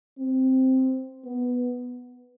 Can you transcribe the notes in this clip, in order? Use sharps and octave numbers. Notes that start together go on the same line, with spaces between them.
C4
B3